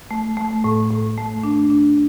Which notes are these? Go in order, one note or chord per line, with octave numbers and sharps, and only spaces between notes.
A3
A3
A2
A2
A3
D4
D4